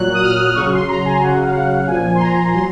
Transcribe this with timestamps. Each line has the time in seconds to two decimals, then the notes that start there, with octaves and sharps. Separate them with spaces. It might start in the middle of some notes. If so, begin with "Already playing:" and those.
Already playing: A#2 F#3 F#6
0.13 D#6
0.22 F6
0.55 C#3 F#3 C#6
0.72 C6
0.88 A#5
1.05 G#5
1.22 C#3 F#3 F#5
1.43 F5
1.55 F#5
1.87 A#2 F3 G#5
2.15 C6
2.20 A#5
2.53 F#3 C6